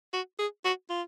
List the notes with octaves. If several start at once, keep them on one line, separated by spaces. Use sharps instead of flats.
F#4
G#4
F#4
F4